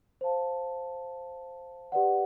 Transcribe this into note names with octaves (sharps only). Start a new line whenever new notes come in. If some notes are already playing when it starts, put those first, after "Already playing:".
C5 F5 A5
G4 B4 D5 F#5